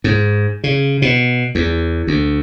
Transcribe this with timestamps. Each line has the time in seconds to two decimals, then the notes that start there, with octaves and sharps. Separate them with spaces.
0.04 G#2
0.64 C#3
1.02 B2
1.55 E2
2.07 D2